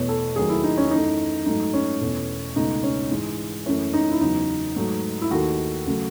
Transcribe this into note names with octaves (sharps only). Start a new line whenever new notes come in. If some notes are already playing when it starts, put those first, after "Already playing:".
Already playing: E2 B2 A3 C#5
A4
D#2 D#3 F#3 A3 G#4
E4
D#4
C#4
F#2 E3 A3 D#4
G#2 F#3 A3 D#4
C#4
E2 B2 A3
C#2 B2 A3 D#4
C#4
G#2 E3 G#3
F#2 E3 A3 C#4
D#4
E4
E2 C#3 F#3 D#4
G#2 F#3 A3
E4
D#2 D#3 A3 F#4
C#3 F#3 A3